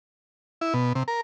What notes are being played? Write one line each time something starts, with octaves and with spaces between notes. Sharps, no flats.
E4
B2
C3
A#4